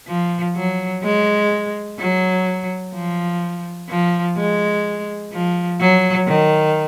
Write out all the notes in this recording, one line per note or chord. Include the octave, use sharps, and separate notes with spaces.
F3
F#3
G#3
F#3
F3
F3
G#3
F3
F#3
D#3